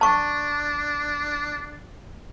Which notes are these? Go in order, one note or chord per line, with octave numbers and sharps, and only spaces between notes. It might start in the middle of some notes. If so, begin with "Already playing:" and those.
D4 A5 C#6